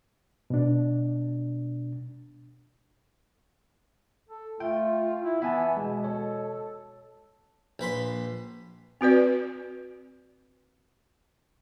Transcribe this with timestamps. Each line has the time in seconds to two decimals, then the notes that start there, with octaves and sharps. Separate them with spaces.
0.50 B2 D4
4.29 A4
4.60 A3 F4 G5
5.22 E4
5.42 E3 B3 E5 G#5 A5
5.77 B2 G#3
6.04 A4 C#5
7.79 A#1 B4 B5 C6
9.01 C4 F#4 B4 D5